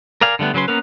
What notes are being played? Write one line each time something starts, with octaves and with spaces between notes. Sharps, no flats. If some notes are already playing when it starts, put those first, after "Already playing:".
A#4 D5 F5 G#5
D3 G3 A3 B3
C#3 F#3 C#4 B4 C6
A#3 B3 C#4 A#4 B4